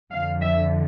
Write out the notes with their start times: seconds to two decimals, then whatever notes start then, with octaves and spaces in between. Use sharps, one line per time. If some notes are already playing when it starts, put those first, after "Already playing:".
0.13 F2 D3 F3 F5
0.41 E5